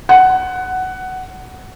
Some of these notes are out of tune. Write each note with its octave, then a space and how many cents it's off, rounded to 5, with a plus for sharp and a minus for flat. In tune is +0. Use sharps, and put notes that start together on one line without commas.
F#5 +10